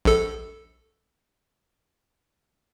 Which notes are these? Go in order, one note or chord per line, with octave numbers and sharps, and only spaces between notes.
A#1 A4